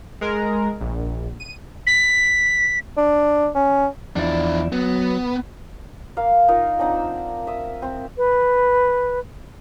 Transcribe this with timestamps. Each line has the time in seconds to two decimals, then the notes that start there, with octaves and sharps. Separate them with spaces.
0.21 G#3 A#4
0.81 A#1
1.40 D#7
1.87 B6
2.97 D4
3.55 C#4
4.16 E2 F3 D4 E4 D5
4.72 F#3 B3
6.17 A#3 F5
6.48 D#4 F4 A#4 D#5
6.79 C4 D4 D#4 F#5
6.95 E6
7.47 E5 D#6
7.82 C4
8.17 B4